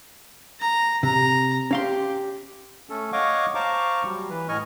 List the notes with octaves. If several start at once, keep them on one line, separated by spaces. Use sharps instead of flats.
A#5
C3 A#5
C#4 G4 F5 C6
A3 C#4 A4
C#5 D#5 F5 F#5 C#6 D6
C5 F5 A5 A#5 C#6 D6
F#3 G3
E3 B4
A2 D#5 G#5 C#6 F6